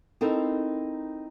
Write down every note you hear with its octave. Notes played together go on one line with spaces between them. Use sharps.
C4 D#4 E4 A4 A#4